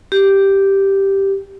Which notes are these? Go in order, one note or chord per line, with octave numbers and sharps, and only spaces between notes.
G4